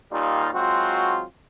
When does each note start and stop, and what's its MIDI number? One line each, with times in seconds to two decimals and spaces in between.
0.12 0.49 39
0.12 0.49 46
0.12 0.49 55
0.12 0.49 63
0.12 0.49 65
0.54 1.23 54
0.54 1.23 56
0.54 1.23 60
0.54 1.23 65
0.54 1.23 66